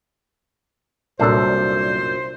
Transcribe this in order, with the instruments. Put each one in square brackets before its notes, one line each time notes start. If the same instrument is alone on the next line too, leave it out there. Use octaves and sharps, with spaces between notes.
[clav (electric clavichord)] C2 D4 A4 [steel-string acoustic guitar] F#2 A#2 [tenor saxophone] C5